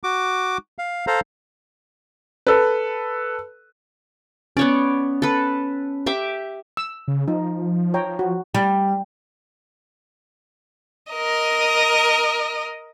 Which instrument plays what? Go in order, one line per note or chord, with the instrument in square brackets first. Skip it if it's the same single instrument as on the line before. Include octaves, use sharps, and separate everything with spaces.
[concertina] F#4 D6
F5
A4 C5 F5 A#5
[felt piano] A4 B4
[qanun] B3 C#5 D5 [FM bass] C#4
[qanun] A4 B4
G4 E5 D6
[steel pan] E6
[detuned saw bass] C#3
[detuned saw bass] F3 [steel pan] D#4
[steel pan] C#5 G5 A#5
F#4
[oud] G3
[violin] A#4 D#5